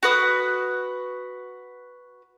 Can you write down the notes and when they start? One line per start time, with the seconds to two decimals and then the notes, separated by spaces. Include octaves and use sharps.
0.03 F#4 B4 D#6